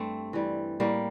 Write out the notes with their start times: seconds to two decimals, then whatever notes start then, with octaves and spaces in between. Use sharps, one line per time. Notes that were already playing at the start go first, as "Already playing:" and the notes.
Already playing: G2 A3 C4
0.33 E3 G3
0.80 A2 G3 A#3